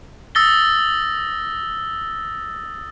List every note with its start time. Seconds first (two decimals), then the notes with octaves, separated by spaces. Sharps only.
0.35 D#6 E6 A6 A#6 G7